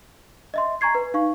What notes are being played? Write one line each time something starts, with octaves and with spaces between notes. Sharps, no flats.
D#5 E5 C6
G#5 A#5 C#6 G#6 C7
B4
D#4 F5 C#6